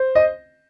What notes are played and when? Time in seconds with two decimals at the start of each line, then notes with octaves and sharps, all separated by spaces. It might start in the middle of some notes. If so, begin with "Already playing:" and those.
Already playing: C5
0.15 D#5